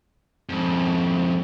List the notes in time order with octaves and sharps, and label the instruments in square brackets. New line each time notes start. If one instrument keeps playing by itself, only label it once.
[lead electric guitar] F2 G#2